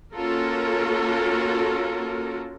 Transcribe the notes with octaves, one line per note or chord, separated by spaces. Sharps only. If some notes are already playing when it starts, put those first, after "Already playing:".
A#3 C#4 F4 F#4 A4 A#4